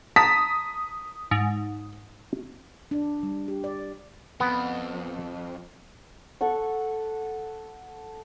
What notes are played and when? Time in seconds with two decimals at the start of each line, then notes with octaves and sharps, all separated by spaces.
0.16 A5 A#5 D#6 B6
1.31 G#2
2.91 D4
3.23 G3
3.48 G4
3.64 D5
4.40 F2 B3
6.41 A4 F#5 C#6